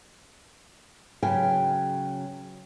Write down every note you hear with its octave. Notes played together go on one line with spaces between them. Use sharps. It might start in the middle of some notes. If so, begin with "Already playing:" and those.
C#3 F#3 B4 G5 G#5